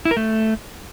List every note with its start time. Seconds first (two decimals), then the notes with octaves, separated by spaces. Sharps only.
0.05 E4
0.11 A#4
0.17 A3